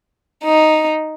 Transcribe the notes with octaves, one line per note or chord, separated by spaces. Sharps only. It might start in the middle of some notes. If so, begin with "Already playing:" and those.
D#4